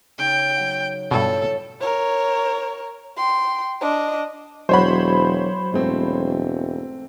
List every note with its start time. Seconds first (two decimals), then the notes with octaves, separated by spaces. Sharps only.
0.19 C#3 D#4 G5
0.56 F#3 F#5
1.11 G2 B2 F4 A4 C#5
1.80 A#4 C#5
3.17 G5 C6
3.81 D4 D#5
4.69 E1 F#3 F#4 C5 C#5 B5
5.72 E1 G#2 A3 C4